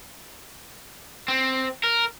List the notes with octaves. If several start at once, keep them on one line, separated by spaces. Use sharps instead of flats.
C4
A#4